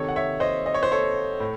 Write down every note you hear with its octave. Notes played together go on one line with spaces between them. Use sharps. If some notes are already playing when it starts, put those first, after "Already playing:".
Already playing: C3 D#3 A4 C#5
F#5
C#5 E5
C5 D#5
D#5
C#5
C5
A4 C#5
A2